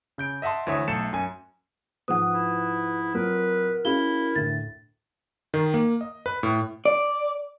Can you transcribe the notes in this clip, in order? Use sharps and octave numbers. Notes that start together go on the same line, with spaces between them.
C#3 G6 D7
D#5 E5 F#5 A5 C6
D2 E3 C#5 E5 D#6
B1 A3 A4 A6 C#7 E7
F#2 G#5
G#2 F3 B4 F#5 D#6
E4
F#3 C4 F4 A#4 B4
C#4 E4 F#4 G#4 D#5 F5 G7
D2 A2 A6
D#3
A#3
D#5
B4
A2
D5